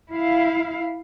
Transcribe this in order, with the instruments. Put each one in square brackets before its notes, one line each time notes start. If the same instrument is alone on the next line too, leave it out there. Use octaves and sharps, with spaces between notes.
[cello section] E4 F5